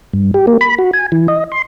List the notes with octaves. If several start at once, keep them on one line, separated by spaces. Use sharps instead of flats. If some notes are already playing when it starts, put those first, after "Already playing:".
G2
G4
A#3
B5
F#4
G#5
E3
D#5
C6